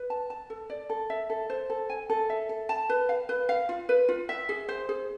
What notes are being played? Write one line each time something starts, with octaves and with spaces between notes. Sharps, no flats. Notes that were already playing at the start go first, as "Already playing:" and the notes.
Already playing: B4
A5
A5
A4
D5
A4
E5
A4
C5
A4
G#5
A4
E5
A4
A5
B4
F5
B4
F5
F4
B4
F4
E5
G#4
C5
G#4